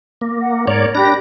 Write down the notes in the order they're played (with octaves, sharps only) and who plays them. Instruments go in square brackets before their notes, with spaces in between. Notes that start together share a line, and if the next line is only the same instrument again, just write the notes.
[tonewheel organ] A#3
[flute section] F#5
[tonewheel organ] G#2 C#5 D5 [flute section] A#4
[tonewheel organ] D4 A#6 [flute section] G4 B5